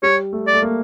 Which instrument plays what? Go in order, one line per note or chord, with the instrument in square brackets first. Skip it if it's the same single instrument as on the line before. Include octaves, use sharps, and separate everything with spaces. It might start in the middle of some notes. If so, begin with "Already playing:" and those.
[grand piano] G3 [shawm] C#5
[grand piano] A3
[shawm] D5
[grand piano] A3
A#3